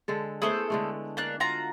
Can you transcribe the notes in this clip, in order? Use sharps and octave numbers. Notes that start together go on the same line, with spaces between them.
D3 G#3 A4
A3 B3 E4 G#4 A4 C5
D3 G#3 A3
A#3 D4 F#6
F4 F#4 A#5